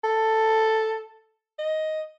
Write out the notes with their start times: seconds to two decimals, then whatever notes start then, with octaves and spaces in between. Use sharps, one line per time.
0.04 A4
1.59 D#5